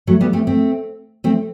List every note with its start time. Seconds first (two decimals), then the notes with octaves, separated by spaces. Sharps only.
0.07 F#3 A3
0.21 G3 B3
0.33 A3 C4
0.47 A3 C4
1.24 A3 C4